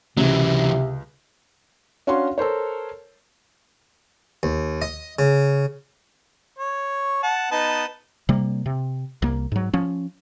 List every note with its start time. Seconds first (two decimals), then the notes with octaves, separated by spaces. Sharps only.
0.17 C#2 C3 E3 F#3
2.07 C#4 D4 F#4 C#5 F5 C6
2.38 A4 A#4 C5 C#5
4.43 D#2
4.82 D#5
5.19 C#3
6.59 C#5
7.23 F#5 A5
7.51 B3 D#4 A5
8.29 C3 G3 A#3
8.66 C3
9.22 C2 A#3
9.52 G#2 F#3
9.73 F3 C#4